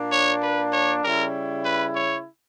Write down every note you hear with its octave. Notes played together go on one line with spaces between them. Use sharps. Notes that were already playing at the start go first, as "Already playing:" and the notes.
Already playing: A#2 A#3 D4
C#5
B4
C#5
C#3 G3 C#4 E4 A#4
B4
C#5